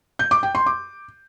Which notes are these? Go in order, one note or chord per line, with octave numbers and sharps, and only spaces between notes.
G6
D6
G5
C6
D6